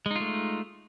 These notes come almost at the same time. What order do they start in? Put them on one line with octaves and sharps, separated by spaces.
G#3 D#4 F4 A3